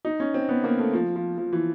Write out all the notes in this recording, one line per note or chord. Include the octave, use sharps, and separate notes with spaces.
D#4
C#4
C4
B3
A#3
A3
F3
F3
F3
E3